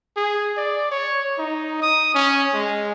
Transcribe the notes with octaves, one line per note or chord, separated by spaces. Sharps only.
G#4
D5
C#5
D#4
D#6
C#4
G#3